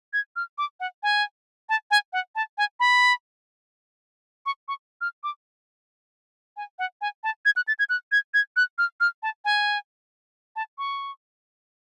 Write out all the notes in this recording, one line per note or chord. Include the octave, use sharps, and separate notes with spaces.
G#6
F6
D6
F#5
G#5
A5
G#5
F#5
A5
G#5
B5
C#6
C#6
F6
D6
G#5
F#5
G#5
A5
G#6
F#6
A6
G#6
F#6
G#6
G#6
F#6
F6
F6
A5
G#5
A5
C#6